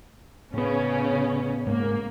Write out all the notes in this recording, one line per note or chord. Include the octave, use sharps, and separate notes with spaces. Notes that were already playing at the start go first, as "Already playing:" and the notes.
A2 C#3 B3 C#4
G#2 A#3